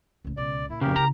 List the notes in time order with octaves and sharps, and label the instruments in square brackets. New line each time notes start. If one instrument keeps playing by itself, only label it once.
[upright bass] C#2 A2
[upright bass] C#2 B2 [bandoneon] D5
[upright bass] A#2 [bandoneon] E4
[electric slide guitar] F2 C#3 [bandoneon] G4 A#4
[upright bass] C#3 E4 [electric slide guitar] A#5